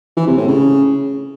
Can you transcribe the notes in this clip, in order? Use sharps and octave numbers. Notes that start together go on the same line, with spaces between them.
E3
C3
A2
C#3